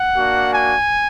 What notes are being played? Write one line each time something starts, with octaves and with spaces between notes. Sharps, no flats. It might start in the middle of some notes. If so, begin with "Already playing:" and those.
Already playing: F#5
A#3 D4 F#4
G#5